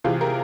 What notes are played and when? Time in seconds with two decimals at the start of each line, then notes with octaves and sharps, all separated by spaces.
0.04 C3 E3 F4 G#4
0.21 G4 A#4